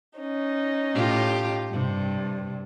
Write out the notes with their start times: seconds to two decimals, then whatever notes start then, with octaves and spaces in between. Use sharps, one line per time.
0.19 C#4 D#4
0.94 A2 F4 G4
1.72 G2 C3